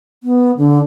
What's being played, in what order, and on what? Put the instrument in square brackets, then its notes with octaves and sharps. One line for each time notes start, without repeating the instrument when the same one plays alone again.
[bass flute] B3
D3